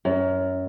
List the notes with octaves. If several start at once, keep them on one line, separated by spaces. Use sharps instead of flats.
F#2